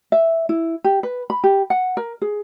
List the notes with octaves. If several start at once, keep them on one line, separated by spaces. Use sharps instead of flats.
E5
E4
G4
B4
B5
G4
F#5
A#4
G#4